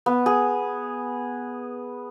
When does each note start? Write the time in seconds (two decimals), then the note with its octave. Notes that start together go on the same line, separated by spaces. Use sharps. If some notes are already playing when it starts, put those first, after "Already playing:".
0.06 B3
0.26 G#4